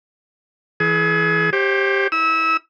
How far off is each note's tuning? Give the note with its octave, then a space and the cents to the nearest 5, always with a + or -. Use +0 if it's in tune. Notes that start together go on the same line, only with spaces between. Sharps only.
E3 +0 G#4 +30
G4 +0 C5 +35
E4 -30 E6 -25